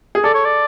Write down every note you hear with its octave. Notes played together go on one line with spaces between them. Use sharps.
G#4
A4 D5
C#5
D5